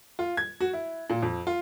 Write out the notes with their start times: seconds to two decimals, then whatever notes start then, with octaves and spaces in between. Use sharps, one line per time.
0.19 F4
0.37 G#6
0.61 F#4
0.73 E4
1.10 A#2
1.22 F2
1.47 F4